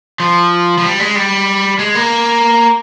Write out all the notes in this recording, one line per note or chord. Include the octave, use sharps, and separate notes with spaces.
F3
F3
G3
G#3
G3
G#3
A#3